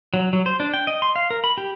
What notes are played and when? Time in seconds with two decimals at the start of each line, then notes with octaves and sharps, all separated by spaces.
0.14 F#3
0.33 F#3
0.46 C5
0.60 D4
0.74 G5
0.87 D#5
1.02 C6
1.16 F5
1.31 A#4
1.44 B5
1.58 G4